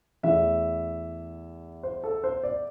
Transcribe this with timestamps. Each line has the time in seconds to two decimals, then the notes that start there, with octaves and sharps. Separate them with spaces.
0.23 E2 E3 A3 E5
1.83 C5
2.04 A4
2.24 C5
2.44 D5